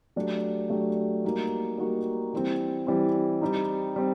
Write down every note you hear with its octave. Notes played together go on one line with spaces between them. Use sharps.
F#3 A3 D4 G4
F#3 A3 D4 G4
G3 A#3 D#4 F#4
G3 A#3 D#4 F#4
E3 G3 C4
E3 G3 C4
G3 C4 D#4
G3 C4